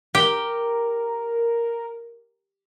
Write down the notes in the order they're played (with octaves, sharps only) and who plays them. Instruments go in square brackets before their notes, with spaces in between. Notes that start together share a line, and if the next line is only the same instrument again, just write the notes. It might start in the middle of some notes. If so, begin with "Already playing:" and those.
[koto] G4 [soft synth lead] A#4